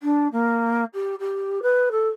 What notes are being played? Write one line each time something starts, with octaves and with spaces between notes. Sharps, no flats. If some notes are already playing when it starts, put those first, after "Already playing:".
D4
A#3
G4
G4
B4
A4